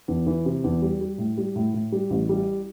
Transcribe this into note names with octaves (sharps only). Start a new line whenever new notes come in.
E2
E3
C3
E2
G3
G3
A2
G3
A2
A2
G3
A1
G3